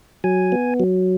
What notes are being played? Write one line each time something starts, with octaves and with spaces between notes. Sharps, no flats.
F#3 G#5
B3
F#3